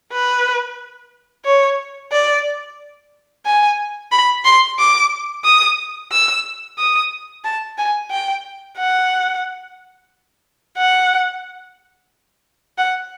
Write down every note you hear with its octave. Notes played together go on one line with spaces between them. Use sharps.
B4
C#5
D5
G#5
B5
C6
D6
D#6
E6
D#6
A5
G#5
G5
F#5
F#5
F#5